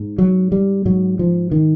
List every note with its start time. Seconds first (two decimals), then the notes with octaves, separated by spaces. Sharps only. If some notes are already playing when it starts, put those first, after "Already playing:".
Already playing: G#2
0.18 F#3
0.52 G3
0.85 G#2 F#3
1.19 F3
1.51 D#3